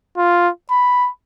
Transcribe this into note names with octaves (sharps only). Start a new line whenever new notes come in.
F4
B5